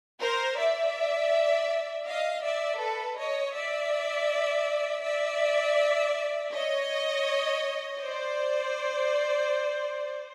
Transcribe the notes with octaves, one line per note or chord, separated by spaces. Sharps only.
A#4 C5
D5 E5
D#5 F5
D5 E5
A4 B4
C#5 D#5
D5 E5
D5 E5
C#5 D#5
C5 D5